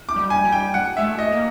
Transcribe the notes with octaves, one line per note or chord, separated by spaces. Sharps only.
D6
G3
G#5
G3
G5
F#5
G#3 E5
A3
D#5
A#3